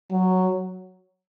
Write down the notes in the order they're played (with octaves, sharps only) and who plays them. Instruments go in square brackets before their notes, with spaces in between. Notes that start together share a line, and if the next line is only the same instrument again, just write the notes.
[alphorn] F#3